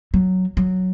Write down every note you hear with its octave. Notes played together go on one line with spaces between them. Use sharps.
F#3
F#3